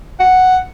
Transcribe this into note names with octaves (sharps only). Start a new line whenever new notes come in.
F#5